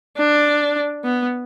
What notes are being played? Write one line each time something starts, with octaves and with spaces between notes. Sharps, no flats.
D4
B3